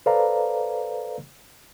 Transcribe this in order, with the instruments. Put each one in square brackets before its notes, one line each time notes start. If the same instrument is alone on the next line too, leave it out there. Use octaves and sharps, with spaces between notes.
[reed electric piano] A4 B4 C5 D5 F5 A#5